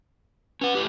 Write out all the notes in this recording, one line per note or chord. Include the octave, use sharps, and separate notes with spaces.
C#4 B4 F#5
E2 A3 G4